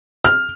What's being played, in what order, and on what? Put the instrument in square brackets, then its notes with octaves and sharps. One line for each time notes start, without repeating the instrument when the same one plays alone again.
[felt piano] F6